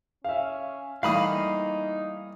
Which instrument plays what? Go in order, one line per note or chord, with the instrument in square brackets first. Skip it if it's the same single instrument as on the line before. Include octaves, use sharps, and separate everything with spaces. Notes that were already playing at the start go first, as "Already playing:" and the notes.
[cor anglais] C#4 [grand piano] E5 F5
[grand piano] E3 [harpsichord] G3 A3 A#3 [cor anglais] D#4 [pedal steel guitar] F5 B5 D#6